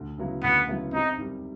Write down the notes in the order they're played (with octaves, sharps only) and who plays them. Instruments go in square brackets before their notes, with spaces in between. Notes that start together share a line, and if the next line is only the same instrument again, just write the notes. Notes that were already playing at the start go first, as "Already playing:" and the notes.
Already playing: [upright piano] D2
C#3 F#3 B3 E4
[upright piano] D2 [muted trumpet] B3
[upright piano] C#3 F#3 B3 E4
[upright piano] C3 [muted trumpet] D#4
[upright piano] D#3 G3